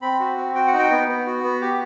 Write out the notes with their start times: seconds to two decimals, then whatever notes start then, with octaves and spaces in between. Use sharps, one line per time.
0.02 C4 B5
0.19 F#4
0.37 C4
0.55 F#4 G5
0.67 F#5
0.73 D#4
0.79 G5
0.90 B3
1.08 B3
1.26 F#4
1.44 B3
1.61 G4